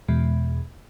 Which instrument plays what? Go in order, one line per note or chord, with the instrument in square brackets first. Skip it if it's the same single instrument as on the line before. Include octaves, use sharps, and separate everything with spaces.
[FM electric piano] E2 B2 G#3